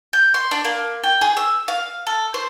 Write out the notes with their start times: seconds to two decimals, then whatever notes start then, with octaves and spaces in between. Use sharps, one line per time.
0.13 G6
0.34 C6
0.51 D4
0.65 A#3
1.03 G5
1.21 G#4
1.37 E6
1.68 F5
2.07 A4
2.34 C5